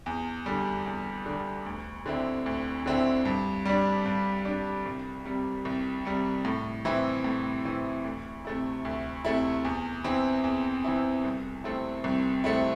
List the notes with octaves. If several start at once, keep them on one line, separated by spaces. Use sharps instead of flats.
E2
D3 G3
E2
D3 G3
D2
D3 C4 E4
D2
D3 C4 E4
G2
G3 D4
G2
G3 D4
C2
C3 G3
C2
C3 G3
A2
E3 C4 E4
A2
E3 C4 E4
D2
C3 A3 E4
D2
C3 A3 E4
E2
E3 C4 E4
E2
E3 C4 E4
C2
C3 A3 C4 E4
C2
C3 A3 C4 E4